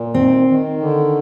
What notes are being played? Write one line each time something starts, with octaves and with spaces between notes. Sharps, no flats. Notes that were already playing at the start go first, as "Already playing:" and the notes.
Already playing: A#2
D#3 C4
D#3
D3